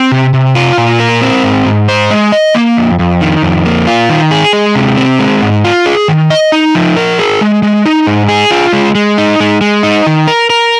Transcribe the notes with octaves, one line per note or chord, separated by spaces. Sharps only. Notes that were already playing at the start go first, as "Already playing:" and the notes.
Already playing: C4
C3
C3
F4
A#2
A#4
C4
G#2
G#2
C5
G#3
D#5
A#3
F2
F2
D#3
F2
A#3
F4
D#3
G#4
G#3
C3
C4
G#3
G#2
F4
G#4
D#3
D#5
D#4
F3
A#4
G#4
G#3
G#3
D#4
G#2
G#4
F4
G#3
G#3
D#4
G#3
G#3
D#4
D#3
A#4
A#4